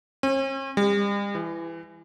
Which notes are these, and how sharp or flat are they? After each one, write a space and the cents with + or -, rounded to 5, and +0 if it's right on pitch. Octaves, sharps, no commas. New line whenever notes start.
C#4 -45
G3 +45
E3 +20